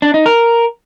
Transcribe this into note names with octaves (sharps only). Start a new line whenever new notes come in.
D4
D#4
A#4